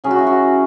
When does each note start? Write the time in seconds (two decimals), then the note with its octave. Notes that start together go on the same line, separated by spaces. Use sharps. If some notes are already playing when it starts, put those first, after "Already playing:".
0.04 C#3 F#3 C#4 G#4
0.11 F#4
0.19 E4
0.27 F#4